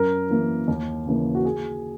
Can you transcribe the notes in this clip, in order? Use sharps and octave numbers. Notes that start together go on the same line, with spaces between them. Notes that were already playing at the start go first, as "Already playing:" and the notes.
Already playing: F#2 A#4
E3 A#3
D#2
C#3 E3 A#3
F#4
G#4